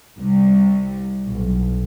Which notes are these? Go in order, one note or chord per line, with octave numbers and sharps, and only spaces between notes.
C2
B1